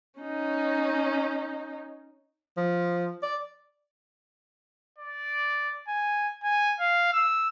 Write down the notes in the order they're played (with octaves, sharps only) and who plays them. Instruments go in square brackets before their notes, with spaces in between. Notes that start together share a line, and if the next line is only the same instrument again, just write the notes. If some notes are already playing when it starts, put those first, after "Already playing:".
[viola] C#4 D#4
[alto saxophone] F3
D5
[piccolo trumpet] D5
G#5
G#5
F5
E6